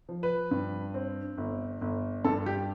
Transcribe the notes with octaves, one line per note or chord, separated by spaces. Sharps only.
F3
B4
G2
C4
G1
G1
G2 A4
G4